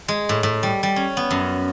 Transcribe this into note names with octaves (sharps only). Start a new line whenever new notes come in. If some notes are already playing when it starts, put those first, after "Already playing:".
G#3
A2
A2
G3
G3
C#4
B3
F#2